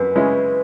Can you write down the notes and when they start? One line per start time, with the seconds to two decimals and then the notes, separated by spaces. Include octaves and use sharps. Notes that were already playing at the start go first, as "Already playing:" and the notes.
Already playing: F#2 B4
0.15 C#3 G#3 C#4 E4